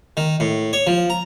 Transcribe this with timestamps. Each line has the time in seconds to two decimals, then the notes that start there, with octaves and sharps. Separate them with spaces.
0.17 D#3
0.40 A2
0.73 C#5
0.87 F3
1.10 A#5